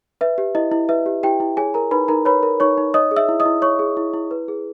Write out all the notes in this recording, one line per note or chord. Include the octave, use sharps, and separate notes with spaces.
B4 E5
G4
E4 D#5
E4
B4 E5
G4
E4 G4 G5
E4
G#4 C#5 G#5
A#4 A#5
D#4 B4 B5
D#4 A#4 A#5
B4 C#5 B5
A#4
D#4 C#5 C#6
D#4
C#5 D#5 D#6
G#4
E5 E6
E4
D#5 D#6
E4
C#5 C#6
G#4
E4
E4
B4
G#4